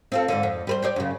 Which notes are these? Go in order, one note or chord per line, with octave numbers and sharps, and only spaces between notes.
C4 F4 A4
G#2 D3
F2
G3 B4 C5
G4 C5 D5
F#2 C#3